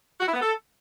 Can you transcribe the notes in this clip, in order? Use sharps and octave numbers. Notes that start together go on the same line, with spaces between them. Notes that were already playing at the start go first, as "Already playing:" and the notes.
F#4
E4
B3
A4